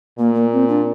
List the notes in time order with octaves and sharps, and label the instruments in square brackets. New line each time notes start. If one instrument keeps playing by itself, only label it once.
[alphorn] A#2 [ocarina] A#3
[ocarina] A#3
C4
D4